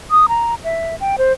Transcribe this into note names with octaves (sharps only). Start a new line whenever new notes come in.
D#6
A#5
E5
G5
C5